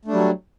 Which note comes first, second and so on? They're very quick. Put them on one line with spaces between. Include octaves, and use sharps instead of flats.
A3 D4 G3 F#3